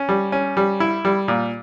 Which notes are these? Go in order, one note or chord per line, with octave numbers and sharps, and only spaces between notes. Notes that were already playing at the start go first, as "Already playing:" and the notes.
Already playing: C#4
G3
C#4
G3
E4
G3
A#2